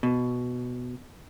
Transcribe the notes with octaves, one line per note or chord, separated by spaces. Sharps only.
B2